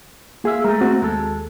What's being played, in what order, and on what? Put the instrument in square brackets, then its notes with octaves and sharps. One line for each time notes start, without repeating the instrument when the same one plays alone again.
[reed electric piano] A#3 G#4 [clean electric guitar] F4 E5
[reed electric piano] G#3 G#4 [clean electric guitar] A3 A#4
[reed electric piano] A#3 C4 F#4
[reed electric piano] D#2 [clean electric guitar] G#3 A4